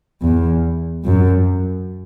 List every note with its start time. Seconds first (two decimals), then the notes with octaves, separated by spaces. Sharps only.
0.22 E2
1.04 F#2